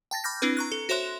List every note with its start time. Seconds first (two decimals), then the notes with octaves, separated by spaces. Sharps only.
0.11 G5 A5 A6 A#6
0.24 B5 D6 F6 G6 A#6
0.42 C4 D4 E4 B4
0.57 A#5 C#6 F#6
0.72 A4
0.89 F#4 C5 C#5 E5 C6 F#6